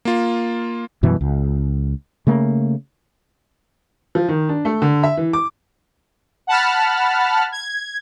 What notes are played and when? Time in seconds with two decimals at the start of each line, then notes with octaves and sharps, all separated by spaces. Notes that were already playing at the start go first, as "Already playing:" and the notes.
0.05 A#3 F4
1.03 F#2 B2 E3 G3
1.21 C#2
2.27 C#3 A3 A#3
4.15 F3
4.29 D#3
4.49 D4
4.65 A3
4.82 D3
5.03 E5
5.17 E3
5.33 D6
6.47 F#5 A5 B5 F6
7.52 G#6